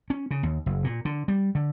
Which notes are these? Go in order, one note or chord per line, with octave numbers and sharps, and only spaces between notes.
C#4
C#3
D#2
F#1
A#2
D3
G3
D3